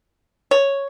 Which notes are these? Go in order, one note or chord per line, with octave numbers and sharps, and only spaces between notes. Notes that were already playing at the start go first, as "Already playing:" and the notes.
C#5